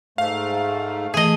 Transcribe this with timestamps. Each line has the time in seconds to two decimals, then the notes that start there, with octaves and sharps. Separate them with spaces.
0.18 G#2 A3 F5
1.14 E3 A3 G#4 D#5